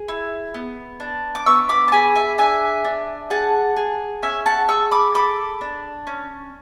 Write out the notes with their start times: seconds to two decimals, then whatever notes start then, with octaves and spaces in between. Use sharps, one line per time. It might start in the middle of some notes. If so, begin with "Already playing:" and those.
Already playing: G#4
0.08 E4
0.54 B3
1.00 D4
1.35 D6
1.46 B3 C#6 E6
1.69 B5 D6
1.88 A5
1.92 G#4 G#5 B5
2.15 E5 G#5
2.38 D4 E5 G#5
2.85 D4
3.30 G#4 F#5 A5
3.76 G#4
4.22 C#4 E5 G#5
4.46 F#5 A5
4.69 G#4 C#6 E6
4.91 B5 D6
5.14 A4 B5 D6
5.61 D4
6.07 C#4